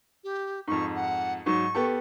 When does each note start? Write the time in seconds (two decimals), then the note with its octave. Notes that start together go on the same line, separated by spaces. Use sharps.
0.24 G4
0.68 F2 G#2 C#6
0.96 F#5
1.46 G#2 F#3 C#6
1.75 B3 G4 A4